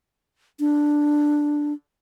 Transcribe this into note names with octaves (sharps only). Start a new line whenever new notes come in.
D4